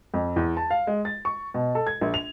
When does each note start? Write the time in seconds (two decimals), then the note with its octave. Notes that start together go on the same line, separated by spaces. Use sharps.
0.14 F2
0.36 E2
0.57 A5
0.70 F5
0.87 G#3
1.05 A6
1.25 C#6
1.54 B2
1.75 A4
1.87 G#6
2.01 A#1
2.14 F7